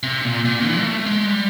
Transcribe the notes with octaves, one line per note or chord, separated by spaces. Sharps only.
C3
A#2
A#2
E3
A#3
A3
G#3
G3